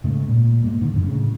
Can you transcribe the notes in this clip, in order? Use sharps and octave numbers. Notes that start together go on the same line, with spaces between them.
G#2 C#3 A3
A#2
G#2 A#3
G#2 D3 D#3
F#2 A2 D3
A2 C#3